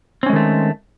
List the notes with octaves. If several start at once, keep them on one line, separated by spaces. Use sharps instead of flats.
D#3 G#3 A3 C4 C#4